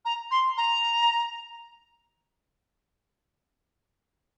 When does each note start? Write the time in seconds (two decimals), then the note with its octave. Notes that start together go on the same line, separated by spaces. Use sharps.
0.05 A#5
0.31 C6
0.57 A#5